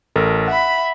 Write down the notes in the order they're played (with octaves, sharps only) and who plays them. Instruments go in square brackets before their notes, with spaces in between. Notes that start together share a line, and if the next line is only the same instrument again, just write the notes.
[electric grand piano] A1 A4 A#4
[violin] E5 B5 [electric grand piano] F#5